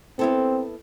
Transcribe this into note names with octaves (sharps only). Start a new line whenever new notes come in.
B3 C4 E4 A4